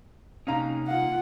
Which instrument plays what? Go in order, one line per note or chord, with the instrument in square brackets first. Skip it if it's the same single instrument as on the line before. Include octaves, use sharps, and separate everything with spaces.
[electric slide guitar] C3 A#3 D#4 [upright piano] C#4 F5 A#5
[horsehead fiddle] F4 F#5 [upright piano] F5